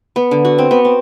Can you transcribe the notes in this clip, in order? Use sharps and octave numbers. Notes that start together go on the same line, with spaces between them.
B3
D3
F#4
C4
B3
C4